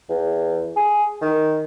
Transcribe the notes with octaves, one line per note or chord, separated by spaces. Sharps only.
E2
G#4
D#3